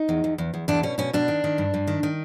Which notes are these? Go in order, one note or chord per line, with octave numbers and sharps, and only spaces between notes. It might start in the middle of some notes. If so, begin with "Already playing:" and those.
Already playing: D#4
E2
E2
E2
E2
E2 D4
B2 C#4
B2 C#4
B2 D4
D#3
D#3
G2
G2
D#3
D#3